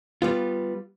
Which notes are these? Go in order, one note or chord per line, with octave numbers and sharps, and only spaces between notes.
G3 B3 F4